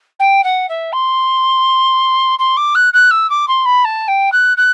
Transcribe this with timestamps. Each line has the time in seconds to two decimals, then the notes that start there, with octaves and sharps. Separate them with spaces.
0.19 G5
0.44 F#5
0.69 E5
0.93 C6
2.39 C6
2.57 D6
2.75 F#6
2.93 F#6
3.11 E6
3.30 D6
3.48 C6
3.65 B5
3.85 A5
4.08 G5
4.32 F#6
4.57 F#6